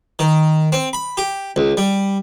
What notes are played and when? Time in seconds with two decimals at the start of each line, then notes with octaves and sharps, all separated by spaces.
0.19 D#3
0.72 C4
0.93 B5
1.17 G4
1.56 C#2
1.77 G3